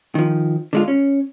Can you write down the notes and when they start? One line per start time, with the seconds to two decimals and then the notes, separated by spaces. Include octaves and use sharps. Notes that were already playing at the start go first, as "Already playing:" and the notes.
0.15 D#3 F3
0.73 D3 G#3 F4
0.88 C#4